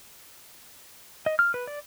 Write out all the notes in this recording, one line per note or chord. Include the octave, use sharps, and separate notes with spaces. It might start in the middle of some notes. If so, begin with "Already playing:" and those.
D#5
F6
B4
D5